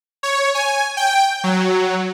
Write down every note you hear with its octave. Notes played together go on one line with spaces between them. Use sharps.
C#5
G#5
G5
F#3